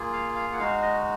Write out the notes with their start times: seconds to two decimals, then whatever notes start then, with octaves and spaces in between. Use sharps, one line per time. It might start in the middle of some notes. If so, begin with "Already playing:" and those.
Already playing: A#3 F4 G#4
0.13 F5
0.36 F5
0.53 F#5
0.59 G#3 D#4 F#4 F5
0.82 D#5